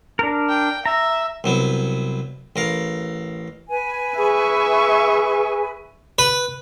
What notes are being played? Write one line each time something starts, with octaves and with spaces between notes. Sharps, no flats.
D4 A#4
G5
E5 A#5
C2 F#3 B3
A1 A#4 F5
B4 G#5
G#4 E5 C#6
B4